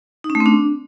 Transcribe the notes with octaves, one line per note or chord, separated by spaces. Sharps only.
D#4
C#4
A3
C4
D4